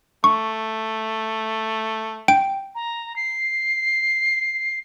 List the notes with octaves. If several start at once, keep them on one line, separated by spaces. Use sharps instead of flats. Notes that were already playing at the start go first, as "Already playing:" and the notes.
A3 C#6
G5 D7
A#5
C7